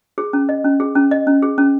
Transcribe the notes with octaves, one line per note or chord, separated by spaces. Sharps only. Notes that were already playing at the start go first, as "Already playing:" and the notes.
G#4
C#4
D#5
C#4
G#4
C#4
D#5
C#4
G#4
C#4